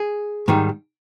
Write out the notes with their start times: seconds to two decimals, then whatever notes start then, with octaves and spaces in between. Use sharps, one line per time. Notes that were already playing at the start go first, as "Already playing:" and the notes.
Already playing: G#4
0.48 G#2 D#3 G3